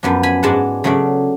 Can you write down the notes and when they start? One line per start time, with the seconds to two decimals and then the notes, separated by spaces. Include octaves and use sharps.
0.03 F#2 F3 B3 D4
0.23 G#5 B5
0.43 G#2 G#3 D4 F#5 A5
0.84 C#3 F#3 A3 D4